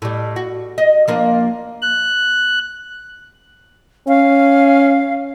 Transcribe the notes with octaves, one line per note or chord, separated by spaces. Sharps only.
A2 G3
F#4
D#5
F3 A#3 D4
F#6
C#4 F5